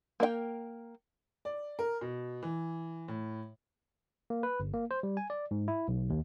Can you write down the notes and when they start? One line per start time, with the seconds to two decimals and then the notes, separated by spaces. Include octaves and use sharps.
0.20 A#3 A#4 D#5 G5
1.45 D5
1.79 A#4
2.01 B2
2.43 E3
3.08 A2
4.30 A#3
4.43 B4
4.60 G1
4.74 A#3
4.91 C5
5.03 G3
5.17 G#5
5.30 D5
5.51 G#2
5.68 E4
5.88 B1
6.10 D#2